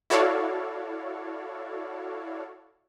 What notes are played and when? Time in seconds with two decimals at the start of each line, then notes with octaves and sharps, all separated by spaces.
0.10 E4 F#4 A4 C#5 D5 F5